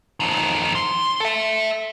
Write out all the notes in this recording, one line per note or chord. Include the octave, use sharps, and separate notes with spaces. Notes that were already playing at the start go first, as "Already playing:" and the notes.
F2 D#3
C6
A4 E5